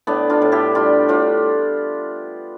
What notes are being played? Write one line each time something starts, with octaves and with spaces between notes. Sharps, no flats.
A2 B3 D4
D4 F4
A2
E4 G4
G3 D4 F4
A2 D4 F4